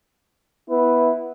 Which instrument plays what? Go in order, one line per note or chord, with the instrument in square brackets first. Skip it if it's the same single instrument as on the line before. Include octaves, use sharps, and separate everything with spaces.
[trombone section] B3 E4 B4